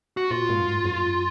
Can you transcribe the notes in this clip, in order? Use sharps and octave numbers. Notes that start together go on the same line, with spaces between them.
F#4
A#2 F4
G#2
F#2
G#2
F#2